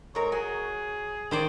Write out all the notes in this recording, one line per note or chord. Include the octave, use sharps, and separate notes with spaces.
G#2 A#4 C#5
F#3 G#4
D#3 C5 D5